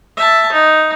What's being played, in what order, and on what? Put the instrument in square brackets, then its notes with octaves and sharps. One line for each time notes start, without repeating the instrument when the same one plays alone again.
[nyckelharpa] E5 A5
D#4